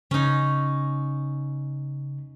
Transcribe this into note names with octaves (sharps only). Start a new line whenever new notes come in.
C#3 C#4 D#4